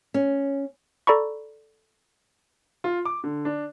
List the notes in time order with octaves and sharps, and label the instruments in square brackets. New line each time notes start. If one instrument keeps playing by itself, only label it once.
[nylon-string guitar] C#4
[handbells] A4 D5 A#5 B5 C#6
[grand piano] F4
D6
D3
D4